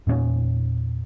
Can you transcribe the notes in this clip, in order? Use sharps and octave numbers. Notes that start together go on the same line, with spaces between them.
E2 A#2 A#3 C#4